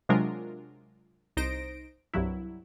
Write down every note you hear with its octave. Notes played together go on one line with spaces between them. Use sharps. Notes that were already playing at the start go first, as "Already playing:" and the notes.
C3 F#3 G#3 D4 F4 A#4
C2 D#4 C5 A#6 D7
C2 G2 F#3 E4